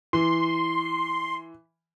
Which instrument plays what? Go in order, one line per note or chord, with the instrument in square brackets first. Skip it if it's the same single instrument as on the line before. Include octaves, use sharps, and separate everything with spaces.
[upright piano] E3 [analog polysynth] C6